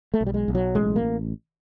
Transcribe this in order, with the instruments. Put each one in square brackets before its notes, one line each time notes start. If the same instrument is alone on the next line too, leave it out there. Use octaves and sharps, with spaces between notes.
[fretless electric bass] A3
B1
G3
G#3
B1
F#3
A1 G#3
A#3